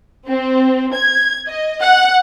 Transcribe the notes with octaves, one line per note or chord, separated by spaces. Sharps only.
C4
G#6
D#5
F#5